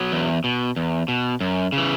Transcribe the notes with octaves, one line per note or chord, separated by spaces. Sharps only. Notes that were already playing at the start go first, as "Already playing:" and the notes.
Already playing: F#3 B3
E2
B2
E2
B2
F#2
C#3
E3